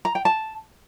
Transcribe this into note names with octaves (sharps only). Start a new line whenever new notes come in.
A#5
G5
A5